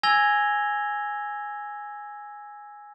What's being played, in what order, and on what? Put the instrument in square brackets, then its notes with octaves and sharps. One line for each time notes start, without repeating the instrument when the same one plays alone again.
[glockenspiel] G#5 E6 G#6 A#6 F7 G7